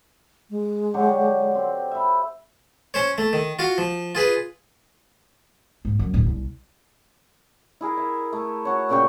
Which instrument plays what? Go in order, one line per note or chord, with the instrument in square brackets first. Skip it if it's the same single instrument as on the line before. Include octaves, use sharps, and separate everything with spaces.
[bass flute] G#3
[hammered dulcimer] D3 F#3 G4
C4 A4
E5 B5
[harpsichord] C#4 C5 C#5
A3
D#3
F4 F#4 F5
F3
F4 G#4 B4
[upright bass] G#2
F#2
D1
C2
[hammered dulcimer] E4 G#4 A#4
E5
A3
F#4 C#5
A#2 C#3 G5 C#6